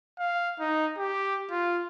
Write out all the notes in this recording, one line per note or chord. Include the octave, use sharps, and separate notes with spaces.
F5
D#4
G4
F4